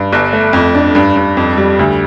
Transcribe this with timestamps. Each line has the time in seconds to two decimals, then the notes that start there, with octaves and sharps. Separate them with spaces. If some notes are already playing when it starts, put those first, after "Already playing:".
Already playing: G2
0.13 G1
0.33 A3
0.53 F2
0.75 D4
0.95 G2
1.16 G2
1.37 F2
1.57 G3
1.79 D2